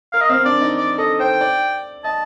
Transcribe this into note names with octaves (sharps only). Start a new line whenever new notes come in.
A#4 F5
D#5
C4 F5
D4 D5
D#4
D5
A4 D#5
C5 G5
D5
D#5 A5